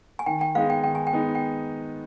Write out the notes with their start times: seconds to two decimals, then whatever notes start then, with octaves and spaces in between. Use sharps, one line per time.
0.19 G#5
0.26 D#3 G5
0.41 G5
0.55 G#3 B3 D#4 F5
0.70 G5
0.84 D#3 G5
0.95 G#5
1.07 G5
1.13 G#3 B3 D#4
1.35 G5